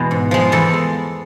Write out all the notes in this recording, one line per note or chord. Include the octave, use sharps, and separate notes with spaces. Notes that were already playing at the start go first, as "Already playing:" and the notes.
Already playing: E2 B2 G#3
G#2
F3 G#3
E2 A4
G#3